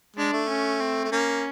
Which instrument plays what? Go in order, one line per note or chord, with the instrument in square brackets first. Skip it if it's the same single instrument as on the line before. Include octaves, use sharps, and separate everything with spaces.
[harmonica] G#3 [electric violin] D4
[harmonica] A3
[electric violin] C#4
C4
[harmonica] A3
[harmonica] A#3 [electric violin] C#4